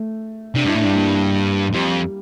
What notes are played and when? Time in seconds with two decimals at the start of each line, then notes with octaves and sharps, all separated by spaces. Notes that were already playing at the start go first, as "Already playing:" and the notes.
Already playing: A3
0.55 C3 D4
0.65 G2 E4
0.75 A2
0.81 G2 D4
0.95 A#3
1.73 F2 G3